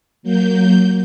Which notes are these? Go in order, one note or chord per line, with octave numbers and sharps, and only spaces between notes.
F#3 A#3 G6